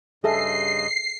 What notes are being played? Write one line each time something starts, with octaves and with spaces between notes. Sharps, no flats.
G2 C#3 G#4 A4 D#5 E5 C7